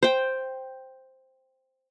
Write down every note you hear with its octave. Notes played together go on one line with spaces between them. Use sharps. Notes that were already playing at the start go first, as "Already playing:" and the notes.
C5 G5